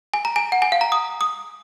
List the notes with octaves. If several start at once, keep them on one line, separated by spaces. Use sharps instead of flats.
G#5
A#5
G#5
F#5
G#5
F5
A#5
D#6
D#6